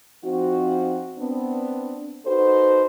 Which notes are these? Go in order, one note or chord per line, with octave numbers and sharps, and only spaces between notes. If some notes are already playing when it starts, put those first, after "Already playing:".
F3 C4 D#4 F#4
B3 C4 D4
D#4 F#4 A4 B4 C5